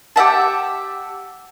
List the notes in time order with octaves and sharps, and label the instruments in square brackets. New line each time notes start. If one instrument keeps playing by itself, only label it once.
[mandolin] G4 E5 F#5 A5